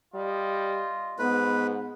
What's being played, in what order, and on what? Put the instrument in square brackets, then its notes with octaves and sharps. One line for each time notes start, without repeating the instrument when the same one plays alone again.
[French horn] G3 [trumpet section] F4 D#5
[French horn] G#2 [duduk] B3 [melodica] B4